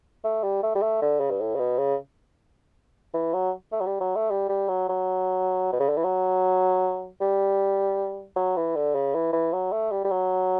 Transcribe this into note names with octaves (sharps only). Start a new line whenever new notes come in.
A3
G3
A3
G3
A3
D3
C#3
G2
A2
C#3
B2
C#3
E3
F#3
A3
F#3
G3
F#3
A3
G3
G3
F#3
F#3
B2
C#3
D3
E3
F#3
G3
F#3
E3
D3
C#3
E3
E3
F#3
A3
G3
G3
F#3